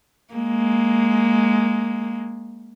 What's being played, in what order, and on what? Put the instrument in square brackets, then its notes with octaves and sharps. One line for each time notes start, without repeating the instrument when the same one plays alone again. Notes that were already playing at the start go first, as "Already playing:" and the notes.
[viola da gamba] G#3 A#3